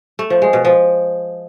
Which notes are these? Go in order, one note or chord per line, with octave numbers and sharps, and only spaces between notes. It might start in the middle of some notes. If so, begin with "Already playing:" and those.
A3
F3
G#3
B2
F3